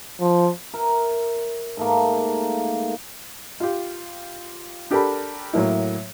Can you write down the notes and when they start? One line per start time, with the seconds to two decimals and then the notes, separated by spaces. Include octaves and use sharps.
0.21 F3
0.74 A#4 E5
1.77 G#2 A3 A#3
3.60 F4 G4
4.91 D4 G4 A4 A#4 A5 B5
5.53 A2 F#3 A#3 E4